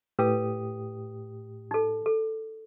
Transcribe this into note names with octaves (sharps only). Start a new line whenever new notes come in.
A2 G4 B4 D#6
D#4 A4
A4